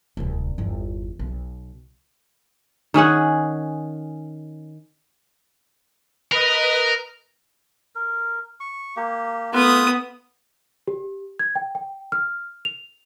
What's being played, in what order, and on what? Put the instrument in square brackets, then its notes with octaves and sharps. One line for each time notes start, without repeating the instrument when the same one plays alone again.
[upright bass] D1 C2
G1 E2
B1
[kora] D#3 C#4 G#4 F#5
[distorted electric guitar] A#4 [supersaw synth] B4 D#5
[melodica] A#4
C#6
A#3 G4
[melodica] A3 F4 B4 [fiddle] B3 D#6
[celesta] G4
G#6
G5
G5
F6
F7